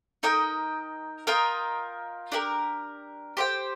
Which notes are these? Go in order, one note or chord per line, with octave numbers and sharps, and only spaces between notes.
D#4 A#4 D#5 G5
F4 A#4 D#5 G5
D4 G4 A#4
G4 C5 G5